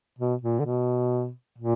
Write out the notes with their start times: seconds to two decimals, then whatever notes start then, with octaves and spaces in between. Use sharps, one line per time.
0.19 B2
0.42 A#2
0.59 D3
0.65 B2
1.58 A#2